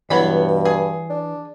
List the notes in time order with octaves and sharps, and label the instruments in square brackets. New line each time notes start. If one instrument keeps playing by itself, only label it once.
[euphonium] G2 [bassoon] B2 [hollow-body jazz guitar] E3 [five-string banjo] F#3 B3 B5
[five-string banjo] G#4
[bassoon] D4